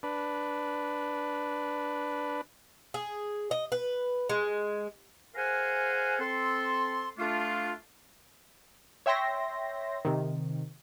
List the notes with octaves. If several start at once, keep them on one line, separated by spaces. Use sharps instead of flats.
D4 B4
G#4
D#5
B4
G#3
G#4 A#4 C5 F5 F#5 G#5
C4 A4 C6
A3 D4 F4
C#5 E5 G5 C6 A#6
C3 D#3